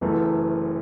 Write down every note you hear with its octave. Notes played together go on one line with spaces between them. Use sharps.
F#1 F#2 E3 A3